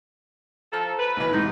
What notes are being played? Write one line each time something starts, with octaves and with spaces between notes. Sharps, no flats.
F3 A4 A#5 F6
B4
B1 B2 E3
B1 G#2 C3 D#4